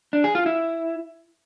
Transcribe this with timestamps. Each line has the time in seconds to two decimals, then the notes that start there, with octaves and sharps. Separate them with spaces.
0.13 D4
0.24 G#4
0.35 F4
0.46 E4